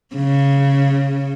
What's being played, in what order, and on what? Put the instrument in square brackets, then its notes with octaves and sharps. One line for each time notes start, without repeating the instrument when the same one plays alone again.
[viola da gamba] C#3